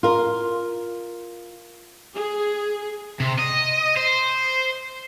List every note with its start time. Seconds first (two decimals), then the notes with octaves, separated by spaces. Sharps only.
0.03 F4 A#4
2.16 G#4
3.20 C3
3.39 D#5
3.96 C5